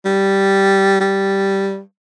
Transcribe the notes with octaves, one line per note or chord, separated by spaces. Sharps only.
G3
G3